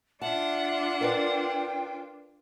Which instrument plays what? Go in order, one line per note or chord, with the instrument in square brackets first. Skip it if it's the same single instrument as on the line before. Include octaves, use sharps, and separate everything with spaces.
[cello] D4 F4 [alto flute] E5 [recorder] F#5 [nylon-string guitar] A5
[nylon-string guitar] A#4 B4 D5 [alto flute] G5